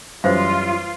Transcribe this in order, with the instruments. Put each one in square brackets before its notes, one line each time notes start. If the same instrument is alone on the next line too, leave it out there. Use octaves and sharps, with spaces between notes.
[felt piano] F#2 E3 G3 [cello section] F4 [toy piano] B4 C5 F5